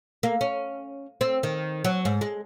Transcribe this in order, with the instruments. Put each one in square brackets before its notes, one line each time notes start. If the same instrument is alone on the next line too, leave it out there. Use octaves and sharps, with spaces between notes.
[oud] A#3
C#4
C4
D#3
F#3
G#2
G#3